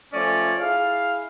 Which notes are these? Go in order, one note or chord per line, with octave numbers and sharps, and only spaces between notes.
F3 A3 C#4 D5
E4 G#4 F5